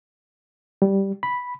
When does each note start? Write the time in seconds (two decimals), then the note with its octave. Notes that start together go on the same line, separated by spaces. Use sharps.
0.82 G3
1.23 B5